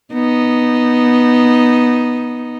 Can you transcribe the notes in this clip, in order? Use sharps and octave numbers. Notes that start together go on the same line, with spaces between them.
B3 D#4